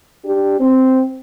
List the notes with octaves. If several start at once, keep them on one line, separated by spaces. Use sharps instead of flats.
D4 G4
C4